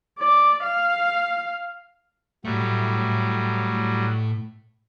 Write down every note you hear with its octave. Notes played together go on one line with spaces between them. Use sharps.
D5
F5
A2 F#3 G3 A3